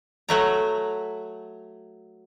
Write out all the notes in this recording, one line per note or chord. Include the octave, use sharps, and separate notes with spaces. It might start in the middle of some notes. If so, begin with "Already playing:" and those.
F#3 A3 A#5